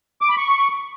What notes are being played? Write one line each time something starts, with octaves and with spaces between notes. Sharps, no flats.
D6
B5
C#6